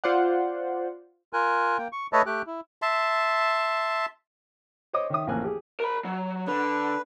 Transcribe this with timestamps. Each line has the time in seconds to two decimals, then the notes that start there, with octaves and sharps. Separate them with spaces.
0.04 F4 C5 D5 F#5
1.33 F4 A#4 G#5 F#6
1.78 A#3 G5
1.93 C#6
2.13 A3 B4 C#5 D#5 E5 A5
2.26 A3 G4 G5 F#6
2.47 E4
2.82 E5 A5 C6
4.93 C5 C#5 D#5 D6 D#6
5.10 D#3 C#5 E5 D#6
5.27 A1 F2 F3 A#3 G#5 F#6
5.44 G4 G#4
5.80 A#4 B5
6.05 F#3
6.47 D3 B4